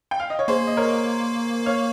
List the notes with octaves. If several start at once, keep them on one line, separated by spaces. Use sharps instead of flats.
G5
F5
D#5
C#5
A#3 G#4 C5
D#5
A#4 C#5
C#5 F5